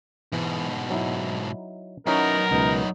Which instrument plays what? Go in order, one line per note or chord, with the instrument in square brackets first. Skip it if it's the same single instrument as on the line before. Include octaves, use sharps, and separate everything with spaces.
[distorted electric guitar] G#2 B2 [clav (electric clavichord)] E3
[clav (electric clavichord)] F#3 D#4 E4
[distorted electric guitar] F#2 B3 [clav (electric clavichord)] F#3 C#4 E4 [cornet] D#4 [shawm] A#4
[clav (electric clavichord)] C#2 B2 [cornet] D#4